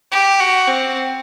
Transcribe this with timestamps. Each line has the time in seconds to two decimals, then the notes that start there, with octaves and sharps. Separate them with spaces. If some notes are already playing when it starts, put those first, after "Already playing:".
0.12 G4
0.40 F#4
0.68 C4